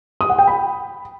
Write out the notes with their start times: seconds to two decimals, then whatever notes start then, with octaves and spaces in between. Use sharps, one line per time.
0.21 D#6
0.30 F#5
0.39 G5
0.47 B5